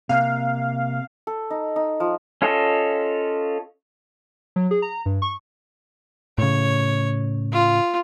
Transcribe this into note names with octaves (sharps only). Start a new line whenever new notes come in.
C3 A#3 F5
A4
D#4
D#4
F3
C#4 F4 A4 C#5 D#5
F#3
G#4
A#5
G2
C#6
A2 C#3 C#5
F4